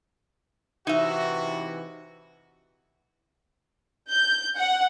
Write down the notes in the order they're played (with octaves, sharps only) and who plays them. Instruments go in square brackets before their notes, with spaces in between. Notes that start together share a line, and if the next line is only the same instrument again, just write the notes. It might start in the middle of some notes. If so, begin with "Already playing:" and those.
[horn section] C3 E3 F#4 [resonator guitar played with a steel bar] D#4 E5
[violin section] G6
F#5